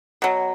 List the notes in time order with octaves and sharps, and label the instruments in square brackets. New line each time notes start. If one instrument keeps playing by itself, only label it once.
[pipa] B2 F#3